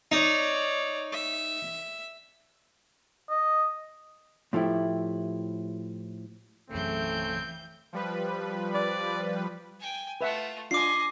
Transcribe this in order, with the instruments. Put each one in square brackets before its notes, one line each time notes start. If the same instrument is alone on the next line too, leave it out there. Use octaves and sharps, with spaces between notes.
[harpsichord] D#4 [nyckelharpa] C#5 D5
[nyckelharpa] E5
[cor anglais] D#5
[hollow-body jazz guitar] A2 F3 A3 E4 G4
[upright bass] B1 F#2 [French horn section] C#3 A3 [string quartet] E3 G6 [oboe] C4
[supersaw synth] F3 G3 B4
[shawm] D5
[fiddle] G5 G#5
[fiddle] A3 F4 [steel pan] B4 E5 F#5
[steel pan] D4 F4 [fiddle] D#5 G#5 [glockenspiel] D6 C7